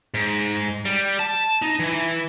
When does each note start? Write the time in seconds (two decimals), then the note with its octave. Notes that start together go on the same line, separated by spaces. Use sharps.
0.14 G#2
0.85 G3
1.19 A5
1.62 D#4
1.79 E3